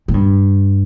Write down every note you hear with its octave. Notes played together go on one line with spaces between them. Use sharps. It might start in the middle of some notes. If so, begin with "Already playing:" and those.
A2
G2